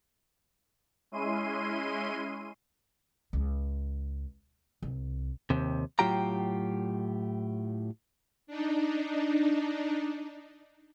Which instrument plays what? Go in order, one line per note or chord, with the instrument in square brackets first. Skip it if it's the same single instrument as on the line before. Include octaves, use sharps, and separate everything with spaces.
[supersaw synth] G#3 C#4 E4 C6 D#7
[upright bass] C#2
C2
[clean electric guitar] D#2 C3
A2 F#3 F4 G4 G5 A#5
[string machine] D4 D#4